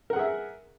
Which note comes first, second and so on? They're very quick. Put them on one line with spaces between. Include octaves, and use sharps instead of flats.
A#4 F#5 G#4 E5